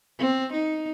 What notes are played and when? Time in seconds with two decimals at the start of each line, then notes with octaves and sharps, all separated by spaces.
0.19 C4
0.52 D#4